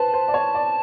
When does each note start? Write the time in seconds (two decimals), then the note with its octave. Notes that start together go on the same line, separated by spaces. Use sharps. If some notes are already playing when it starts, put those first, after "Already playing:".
Already playing: B4 C5 A5
0.13 C5
0.28 D5
0.34 C#5
0.55 D5